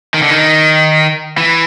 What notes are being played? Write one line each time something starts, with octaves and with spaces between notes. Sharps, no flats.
D#3
D3
D#3
E3